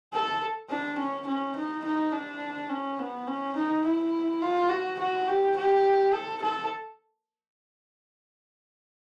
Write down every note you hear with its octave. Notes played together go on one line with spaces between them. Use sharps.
A4
D4
C#4
C#4
D#4
D#4
D4
C#4
B3
C#4
D#4
E4
F4
F#4
F#4
G4
G4
A4
A4